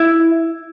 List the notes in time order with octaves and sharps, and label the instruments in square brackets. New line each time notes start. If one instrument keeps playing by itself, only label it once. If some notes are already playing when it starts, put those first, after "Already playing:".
Already playing: [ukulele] E4